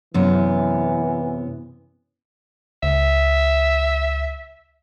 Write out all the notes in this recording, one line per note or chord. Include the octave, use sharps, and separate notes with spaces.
F#2 C3 E3 B3
C#2 E5